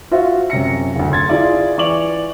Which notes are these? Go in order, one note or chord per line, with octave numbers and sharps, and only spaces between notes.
F4 F#4 C5 E5
F#2 C3 A#6 C#7
F#1 D2
C6 G#6 A6
E4 F4 G#4 D5
E3 D5 C#6 D6 F7 F#7